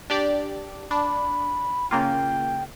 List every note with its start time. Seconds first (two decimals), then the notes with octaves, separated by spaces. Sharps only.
0.10 D4 G4 D5
0.91 D4 B5
1.91 C#3 A#3 F4 G5